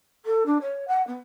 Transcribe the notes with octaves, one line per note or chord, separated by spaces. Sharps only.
A4
D4
C#5
F#5
B3